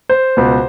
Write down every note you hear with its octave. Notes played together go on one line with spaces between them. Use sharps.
C5
C#2 B2